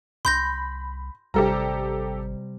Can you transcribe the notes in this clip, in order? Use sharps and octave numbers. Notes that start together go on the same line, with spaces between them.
C2 B5 C6 G6 A#6
G#1 C3 G3 G4 A4 A#5